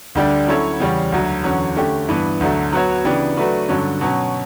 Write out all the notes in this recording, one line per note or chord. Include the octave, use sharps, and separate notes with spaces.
D2 D3 G3 D4 G4
F#3 C#4 E4 A4 C#5
E2 C#3 G3 C#4
D2 D3 F#3
E2 D3 F#3 C#4
D3 A3 C#4 G4
G2 E3 B3
D2 D3 F#3 A3
F#3 B3 F#4 C#5
C#3 E3 B3 D4 G4
F#3 A3 D4 F#4 B4
G2 D3 F#3 C#4
B2 F#3 C#4